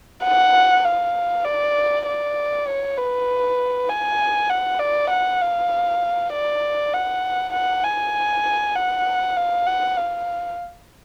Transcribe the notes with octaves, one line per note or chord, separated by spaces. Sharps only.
F#5
F5
D5
D5
C#5
B4
G#5
F#5
D5
F#5
F5
D5
F#5
F#5
G#5
F#5
F5
F#5
F5